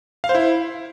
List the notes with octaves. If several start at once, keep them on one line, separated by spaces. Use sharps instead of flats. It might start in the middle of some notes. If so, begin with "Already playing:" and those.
F5
C5
E4